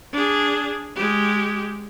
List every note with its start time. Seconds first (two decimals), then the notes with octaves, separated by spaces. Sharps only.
0.13 D4 G#4
0.96 G#3 G4